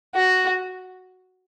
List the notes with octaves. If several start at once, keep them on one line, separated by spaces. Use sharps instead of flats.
F#4